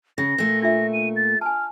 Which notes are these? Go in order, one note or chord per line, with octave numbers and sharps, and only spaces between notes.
C#3 A#6
A#2 A3
D4 F4 E5 A#6
D#7
A6
G#5 A5 F6